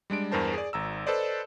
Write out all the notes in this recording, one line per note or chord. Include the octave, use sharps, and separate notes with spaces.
G3 G#3 D4 D7
E2 G2 A#4 C5 A5
G#4 D5
G#1 A#5 E6
A4 B4 C5 D5 D#5